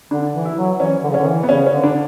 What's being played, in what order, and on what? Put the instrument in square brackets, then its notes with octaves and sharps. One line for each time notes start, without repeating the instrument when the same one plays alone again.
[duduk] D3 [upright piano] D4
[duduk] E3
[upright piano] E4
[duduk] F#3
[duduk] E3 [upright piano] C#4
[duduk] D3
C#3
[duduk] D3 [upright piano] C#4
[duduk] E3
[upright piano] B3
[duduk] C#3 [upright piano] C#4
[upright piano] C#4
[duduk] D3
[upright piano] D4